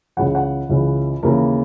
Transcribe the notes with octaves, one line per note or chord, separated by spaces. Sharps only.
C#2 C#3 E3 F#5
F#5
C#2 C#3 E3
D#2 C#3 E3 A#4